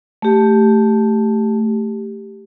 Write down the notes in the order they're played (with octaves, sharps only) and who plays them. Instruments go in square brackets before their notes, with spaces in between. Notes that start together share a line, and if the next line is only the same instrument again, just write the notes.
[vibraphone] A3 G4